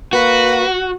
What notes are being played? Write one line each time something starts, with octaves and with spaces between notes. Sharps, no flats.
A#3 F#4 B4